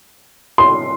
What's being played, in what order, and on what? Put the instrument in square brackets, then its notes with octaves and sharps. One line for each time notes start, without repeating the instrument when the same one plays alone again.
[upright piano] C6